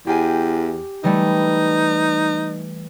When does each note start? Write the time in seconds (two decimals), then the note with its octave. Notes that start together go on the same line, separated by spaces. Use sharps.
0.07 E2 G4 G#5
1.04 E3 G3 A3 D#4